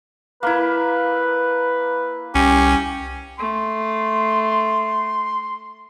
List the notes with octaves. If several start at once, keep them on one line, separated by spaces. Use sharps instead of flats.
A#3 E4 B4
C2 C#4 G4
A3 C6